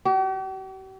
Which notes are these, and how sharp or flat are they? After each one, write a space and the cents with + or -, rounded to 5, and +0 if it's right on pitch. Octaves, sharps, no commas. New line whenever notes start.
G4 -45